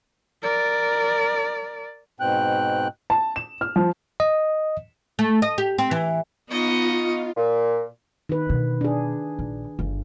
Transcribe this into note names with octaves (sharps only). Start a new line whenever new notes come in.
A#4 D5
G#2 B2 C4 G5 F#6
A5
E7
F6
F3
D#5
A3
D#5
G4
C4
E3
B3 D#4 F4 D#5 C#6
A#2
D#3 B4
B2 D3
D4 G#4
A#1
G1